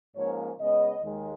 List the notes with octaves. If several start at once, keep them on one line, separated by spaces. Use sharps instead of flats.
G#2 F3 A#3 C#4 C#5
C#3 G#3 B3 D#5
D#2 D#3 G#3